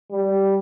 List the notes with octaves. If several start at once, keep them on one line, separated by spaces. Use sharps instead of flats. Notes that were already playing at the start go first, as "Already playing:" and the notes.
G3